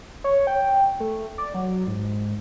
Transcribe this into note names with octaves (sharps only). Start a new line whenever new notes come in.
C#5
G5
A3
D5
F#3
G#2